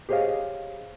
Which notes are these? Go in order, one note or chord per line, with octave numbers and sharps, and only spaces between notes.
G4 G#4 C5 C#5 D#5 F5